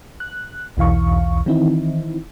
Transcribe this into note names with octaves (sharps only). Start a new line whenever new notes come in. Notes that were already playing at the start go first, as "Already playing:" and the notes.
F#6
B1 E2 E3 F5 C#6
D#3 E3 C4 D#4 E4